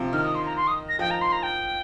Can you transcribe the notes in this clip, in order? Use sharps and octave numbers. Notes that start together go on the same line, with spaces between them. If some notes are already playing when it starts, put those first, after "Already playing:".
Already playing: C3 F3
D#3 F6
D#6
C6
A#5
C6
D#6
A#6
F3 G5
A#5
C6
A#5
G5